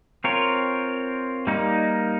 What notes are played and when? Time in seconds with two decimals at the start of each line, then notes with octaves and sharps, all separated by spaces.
0.24 C4 F4 A#4 C#5
1.47 G3 A#3 D#4